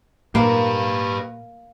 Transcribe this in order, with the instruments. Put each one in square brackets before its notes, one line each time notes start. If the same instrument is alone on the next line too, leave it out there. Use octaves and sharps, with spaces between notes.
[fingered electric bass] A#2 [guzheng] A#3 [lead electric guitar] G4 B4